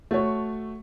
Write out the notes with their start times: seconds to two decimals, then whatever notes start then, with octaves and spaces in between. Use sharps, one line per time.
0.11 A3 F#4 C#5